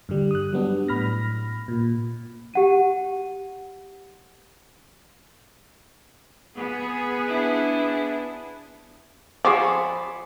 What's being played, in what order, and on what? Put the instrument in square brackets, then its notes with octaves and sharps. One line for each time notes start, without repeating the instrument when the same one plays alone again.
[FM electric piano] G2 D3 G3
D#6 F#6
F#3 G3 B3 D4
A2 B5 F6 A#6
A#2
[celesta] G4 F#5 D#7
[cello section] B3 G#4
[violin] D4 E4
[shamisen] F3 G#4 [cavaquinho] C5 C#5 D6
[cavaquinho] B5